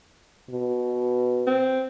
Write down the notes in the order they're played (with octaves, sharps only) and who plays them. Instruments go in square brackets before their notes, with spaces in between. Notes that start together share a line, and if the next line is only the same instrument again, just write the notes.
[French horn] B2
[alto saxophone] C4